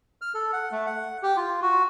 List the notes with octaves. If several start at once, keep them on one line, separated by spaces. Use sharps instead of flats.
F6
A4
F#5
A3
F#5
G4
F4
F#4